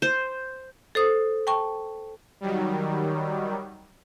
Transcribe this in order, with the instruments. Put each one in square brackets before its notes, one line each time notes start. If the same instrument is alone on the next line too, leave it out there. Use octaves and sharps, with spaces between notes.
[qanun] C5
[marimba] A4 C5 D#6
G5 A5 C#6
[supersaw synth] D#3 F#3 G3